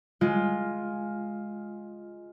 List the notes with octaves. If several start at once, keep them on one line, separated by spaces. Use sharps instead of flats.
G#3 F4